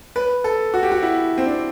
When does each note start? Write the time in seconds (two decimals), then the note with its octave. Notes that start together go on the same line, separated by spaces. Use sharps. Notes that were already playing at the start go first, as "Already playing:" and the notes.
0.16 B4
0.44 A4
0.74 F#4
0.83 G4
0.92 F#4
1.03 E4
1.38 C4
1.46 D4